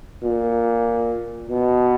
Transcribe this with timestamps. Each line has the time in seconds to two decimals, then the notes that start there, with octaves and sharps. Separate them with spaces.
0.23 A#2
1.49 B2